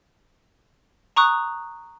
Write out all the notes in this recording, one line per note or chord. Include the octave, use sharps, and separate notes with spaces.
A#5 C#6 D#6 F#6